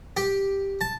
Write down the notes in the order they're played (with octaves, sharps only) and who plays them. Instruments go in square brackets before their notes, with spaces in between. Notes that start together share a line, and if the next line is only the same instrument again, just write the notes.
[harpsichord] G4
A5